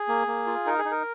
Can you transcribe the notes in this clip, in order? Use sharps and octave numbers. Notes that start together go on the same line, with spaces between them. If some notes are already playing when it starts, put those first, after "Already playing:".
Already playing: G#4
A#3
A#3
F4
D#4 A#4
G#4
D#4
A#4